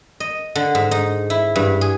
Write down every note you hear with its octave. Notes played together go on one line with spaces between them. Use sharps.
D#5
D3
G#2
D#4
E4
G2
G#4